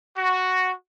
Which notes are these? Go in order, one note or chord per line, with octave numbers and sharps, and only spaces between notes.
F#4